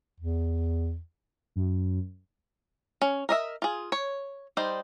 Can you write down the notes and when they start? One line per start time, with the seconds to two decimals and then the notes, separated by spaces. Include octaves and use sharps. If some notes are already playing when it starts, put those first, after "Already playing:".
0.20 E2
1.56 F#2
3.01 C#4
3.29 A#4 D#5 E5
3.62 F4 G#4
3.92 C#5
4.57 G3 D#4 C5